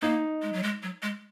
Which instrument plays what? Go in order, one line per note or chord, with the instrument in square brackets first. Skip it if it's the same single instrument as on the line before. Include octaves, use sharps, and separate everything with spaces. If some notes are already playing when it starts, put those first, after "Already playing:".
[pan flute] A#3 [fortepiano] D#4
[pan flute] G#3
F#3
G#3
F#3
G#3